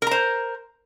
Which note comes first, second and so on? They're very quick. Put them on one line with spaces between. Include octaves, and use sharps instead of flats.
A#4 A#5 C5